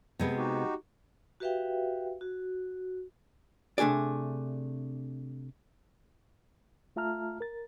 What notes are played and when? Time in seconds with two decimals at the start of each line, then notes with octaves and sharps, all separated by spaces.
0.19 C3 G#3 B3
0.37 D#4 F#4 G4
1.40 F#4 G4 B4 E5 F5 G5
2.21 F#4
3.78 C3 A3 D4 G#4 D5
6.96 A3 F4 E5 A5 A#5 F6
7.41 A#4 A6